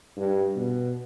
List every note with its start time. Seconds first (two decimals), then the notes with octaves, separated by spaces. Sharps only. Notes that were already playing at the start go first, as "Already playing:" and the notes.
0.17 G2
0.56 B2